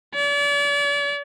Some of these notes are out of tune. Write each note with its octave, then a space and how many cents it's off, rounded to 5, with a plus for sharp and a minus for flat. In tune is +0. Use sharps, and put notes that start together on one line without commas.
D5 -40